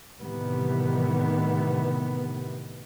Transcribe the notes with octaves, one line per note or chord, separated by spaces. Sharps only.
A2 C3 D#3 E3 G3 B3